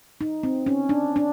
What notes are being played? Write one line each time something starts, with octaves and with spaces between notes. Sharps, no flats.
D#4
C4
C#4
D4
D4